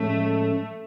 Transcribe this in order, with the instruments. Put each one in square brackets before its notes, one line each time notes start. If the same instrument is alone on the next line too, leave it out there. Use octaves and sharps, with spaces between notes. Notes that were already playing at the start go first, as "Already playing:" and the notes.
Already playing: [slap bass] A2 F3 G#3 C#4 [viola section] A3